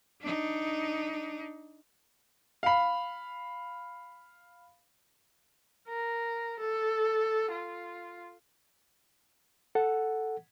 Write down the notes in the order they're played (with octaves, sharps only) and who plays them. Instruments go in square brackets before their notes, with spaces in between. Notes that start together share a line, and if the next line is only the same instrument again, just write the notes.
[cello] D4 D#4
[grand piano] F5 B5
[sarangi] A#4
A4
F4
[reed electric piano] A4 F#5